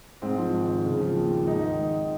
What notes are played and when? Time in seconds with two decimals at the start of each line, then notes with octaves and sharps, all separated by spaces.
0.22 G#2 C4
0.38 F3
0.53 G#1
0.69 G#1
0.85 C#3
1.00 F3
1.16 D#2
1.32 D#2
1.47 G#2 D#4
1.63 D#3
1.79 G#1